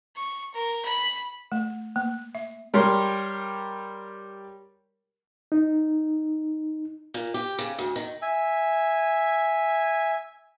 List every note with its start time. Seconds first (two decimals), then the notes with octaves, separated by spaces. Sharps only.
0.15 C#6
0.53 A#4
0.85 B5
1.52 A3
1.96 A#3
2.35 E5
2.74 G3 G4 A#4 C#5 C6
5.52 D#4
7.14 A#2
7.34 G4
7.59 C#3
7.78 D2
7.96 D#3
8.22 E5 G#5